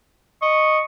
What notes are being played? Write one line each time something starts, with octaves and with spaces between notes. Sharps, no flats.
D#5 C#6